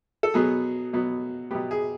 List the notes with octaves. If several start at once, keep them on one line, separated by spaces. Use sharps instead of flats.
A4
B2 F#3 B3 G#4
B2 F#3 B3
B2 F#3 B3 G4
G#4